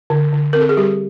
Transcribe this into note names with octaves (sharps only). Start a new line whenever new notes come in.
D3
D3
C4 A#4
A4
G#4
G3 G4